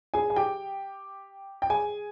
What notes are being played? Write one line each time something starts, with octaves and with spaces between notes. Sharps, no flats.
G#4 G#5
G#5
G4 G5
G5
G#4 G#5